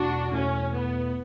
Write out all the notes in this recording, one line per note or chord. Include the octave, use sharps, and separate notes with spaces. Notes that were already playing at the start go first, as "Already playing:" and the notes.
Already playing: E2 B2 A3 D4 E4 F#4
E2 B2 A3 C#4 E4
B3